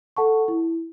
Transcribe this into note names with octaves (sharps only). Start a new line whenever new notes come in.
A4 F#5 A5 C#6
E4